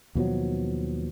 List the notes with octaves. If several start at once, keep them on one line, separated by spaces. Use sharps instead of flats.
D#2 B2 F3 F#3